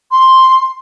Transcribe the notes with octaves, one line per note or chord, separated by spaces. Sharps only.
C6